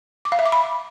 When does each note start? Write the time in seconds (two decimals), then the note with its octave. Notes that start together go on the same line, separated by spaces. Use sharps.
0.25 D6
0.32 F5
0.39 E5
0.46 D6
0.52 B5